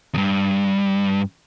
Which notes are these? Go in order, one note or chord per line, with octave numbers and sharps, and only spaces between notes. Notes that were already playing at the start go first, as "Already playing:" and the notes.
E2 G2